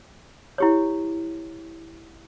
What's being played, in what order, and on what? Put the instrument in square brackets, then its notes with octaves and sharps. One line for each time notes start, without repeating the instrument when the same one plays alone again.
[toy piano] E4 G4 C#5